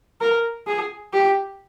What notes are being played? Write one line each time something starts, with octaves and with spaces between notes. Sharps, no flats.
A#4
G#4
G4